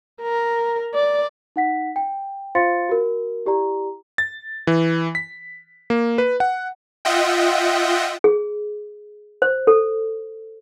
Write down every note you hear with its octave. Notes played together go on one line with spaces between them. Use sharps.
A#4
D5
D#4 F#5 B6
G5
F4 C5 F5 C6 A6 C#7
F#4 A#4
E4 G4 D5 A#5
A6
E3
B6
A#3
B4
F#5
F4 D#5 E5 F#5 G5
G#4
C5
A4